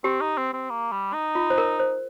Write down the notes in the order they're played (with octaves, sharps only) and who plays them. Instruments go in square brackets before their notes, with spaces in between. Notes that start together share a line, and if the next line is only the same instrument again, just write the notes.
[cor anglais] C4 [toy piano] G4
[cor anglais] D#4
C4
C4
A#3
G3
D#4
[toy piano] F4
C5
A#4
C5